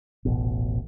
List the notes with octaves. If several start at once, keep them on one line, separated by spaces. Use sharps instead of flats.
D#1 A1 B2